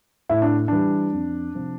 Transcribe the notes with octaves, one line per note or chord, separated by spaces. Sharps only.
A2 E4
D4
E3 G3 D4
F2
C3 F3